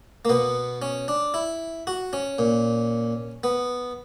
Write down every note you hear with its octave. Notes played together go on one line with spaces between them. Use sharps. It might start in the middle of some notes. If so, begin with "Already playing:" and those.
A#3
B2 B3
C#4
D4
E4
F#4
C#4
A#2
B3